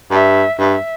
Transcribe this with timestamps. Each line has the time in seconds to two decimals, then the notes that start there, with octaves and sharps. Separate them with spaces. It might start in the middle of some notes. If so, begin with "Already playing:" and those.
0.11 G2 E5
0.59 G2 E5